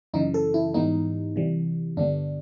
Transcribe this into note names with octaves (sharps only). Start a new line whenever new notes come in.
F#2 C#3 E3 D#4
A4
E4
G#2 E3 G3 B3 D#4
C3 E3 G3
G2 D3 G3 B3 D4